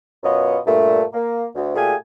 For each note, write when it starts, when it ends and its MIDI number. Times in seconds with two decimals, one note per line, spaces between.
0.24 0.58 42
0.24 0.58 47
0.24 0.58 59
0.24 0.58 65
0.24 0.58 73
0.24 0.58 75
0.66 1.02 43
0.66 1.02 46
0.66 1.02 57
1.13 1.45 58
1.55 1.75 38
1.75 1.94 46
1.75 1.94 57
1.75 1.94 67
1.75 1.94 68
1.75 1.94 77
1.75 1.94 80